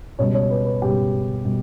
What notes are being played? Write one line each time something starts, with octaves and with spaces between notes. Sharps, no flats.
C#2 B2 G3 C#5
C#5
B4
B4
C#2 B2 G3 G4
B2 G3